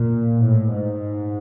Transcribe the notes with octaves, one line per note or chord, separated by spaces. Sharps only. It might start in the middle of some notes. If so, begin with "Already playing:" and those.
Already playing: A#2
A2
G#2